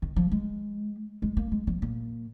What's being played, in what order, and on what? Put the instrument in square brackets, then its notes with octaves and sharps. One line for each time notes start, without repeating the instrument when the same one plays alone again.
[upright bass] D#3
F3
G#3
G#3
A#3
G#3
F3
A#2